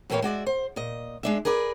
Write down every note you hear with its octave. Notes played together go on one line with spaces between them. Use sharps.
A2 E3 A#3 G4 C#5 F5
G#3 F#4 D5 E5
C5
A#2 D#5
G#3 D4 E5
G#4 A#4 B4 D5